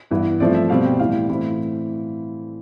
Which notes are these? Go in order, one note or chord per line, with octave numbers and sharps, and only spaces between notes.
G2 E3 B3
G2 F3 A3 C4 D5
E5
B2 G3 C4 F5
G5
A2 E3 G3 F5
A2 E3 A3 C4 B5